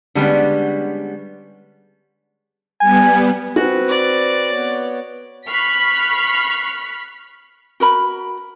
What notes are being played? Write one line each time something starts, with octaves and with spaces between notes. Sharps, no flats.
D3 G3 G#3 B3 C#4
G3 B3 G#5
C4 F#4 B4
D5
B3 C#5
B5 C#6 F6 F#6 B6 C7
F#4 A#4 B5